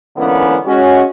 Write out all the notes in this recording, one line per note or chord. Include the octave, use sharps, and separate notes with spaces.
G#2 D3 E3 A#3 B3 C#4
G#3 C#4 F#4